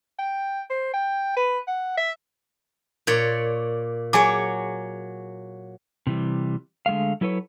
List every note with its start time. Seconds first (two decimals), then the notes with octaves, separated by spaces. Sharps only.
0.19 G5
0.70 C5
0.94 G5
1.36 B4
1.67 F#5
1.97 E5
3.07 A#2 C#5 D5
4.13 F#3 G#4 C#5 G#5 D6
6.07 C3 E3 G3
6.86 D3 G#3 A3 F5
7.21 F#3 E4 A4 B4 C#5